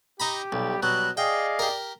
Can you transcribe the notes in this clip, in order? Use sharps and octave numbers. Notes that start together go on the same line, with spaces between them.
D#4 G4 A#5 B5
B1 G3
B2 F#3 F#6
G#4 D5 D#5 F5 G5
G4 A#4